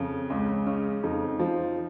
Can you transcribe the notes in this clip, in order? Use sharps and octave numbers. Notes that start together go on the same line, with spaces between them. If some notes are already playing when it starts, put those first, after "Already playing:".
Already playing: F2 C#3
C#2 C#4
C#3 C#4
F2 D#4
F3